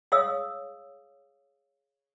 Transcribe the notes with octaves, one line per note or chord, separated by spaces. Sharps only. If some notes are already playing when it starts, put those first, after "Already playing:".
G#4 C#5 D#5 F5 D#6 E6